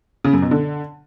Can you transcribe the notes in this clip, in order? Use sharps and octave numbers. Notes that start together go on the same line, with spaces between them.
C#3
F#2
B2
D3